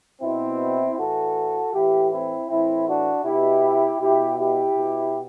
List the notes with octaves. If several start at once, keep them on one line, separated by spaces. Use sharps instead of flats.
B2 C4 E4
A2 E3 F#4 A4
A2 E3 E4 G4
C4 E4
A2 E3 C4 E4
D4 F#4
B2 E4 G4
B2 E4 G4
E4 G4
B2